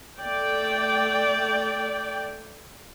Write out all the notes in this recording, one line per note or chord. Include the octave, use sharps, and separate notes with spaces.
A3 D5 G5